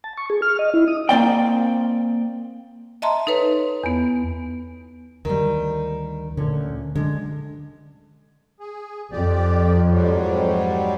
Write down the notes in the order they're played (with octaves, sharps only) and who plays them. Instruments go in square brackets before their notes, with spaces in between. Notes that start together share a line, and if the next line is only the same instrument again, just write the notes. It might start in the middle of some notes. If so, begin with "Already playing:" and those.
[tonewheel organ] A5
C#6
G#4
F6
D#5
E4
D#6
[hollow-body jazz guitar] A#3 C4 D5 G5
[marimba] D#5 E5 A5 A#5 C6
D#4 A4 B4 C#5
E2 B3
[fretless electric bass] D2 [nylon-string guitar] D#3 G3
[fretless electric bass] D2 A#2 D3 [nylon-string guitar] C#4
[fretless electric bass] D3 D4 [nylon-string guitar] G#3
[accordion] G#4
[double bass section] F2 [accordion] G4 D5
[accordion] G#2 F#3 G3